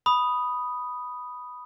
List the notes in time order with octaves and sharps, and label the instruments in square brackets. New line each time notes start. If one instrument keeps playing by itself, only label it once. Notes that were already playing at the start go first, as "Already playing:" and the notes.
[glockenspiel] B5 D#6